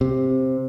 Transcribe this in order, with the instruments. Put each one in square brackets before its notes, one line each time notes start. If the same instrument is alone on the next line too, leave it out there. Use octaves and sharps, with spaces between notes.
[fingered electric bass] C3